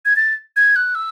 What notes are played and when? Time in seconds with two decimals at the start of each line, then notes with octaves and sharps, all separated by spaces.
0.05 G#6
0.16 A6
0.56 G#6
0.76 F#6
0.95 E6